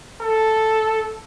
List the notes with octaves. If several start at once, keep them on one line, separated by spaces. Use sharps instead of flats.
A4